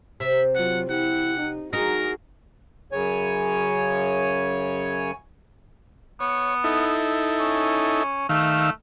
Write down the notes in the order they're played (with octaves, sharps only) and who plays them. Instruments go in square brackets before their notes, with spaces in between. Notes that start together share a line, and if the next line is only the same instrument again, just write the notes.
[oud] C3 [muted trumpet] E5
[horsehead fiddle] F#3 F4 [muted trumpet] F#5
[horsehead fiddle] E4 G4 [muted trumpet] F#5
[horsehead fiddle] D#4
[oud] D#4 [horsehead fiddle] F#4 G#4 [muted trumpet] A#4
[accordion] F#2 C#3 C#5 G#5
[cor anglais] B3 [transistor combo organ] C#5
[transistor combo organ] D#4 E4 A4
[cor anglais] C#4
[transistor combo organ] D#3 F5 E6 [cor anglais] A3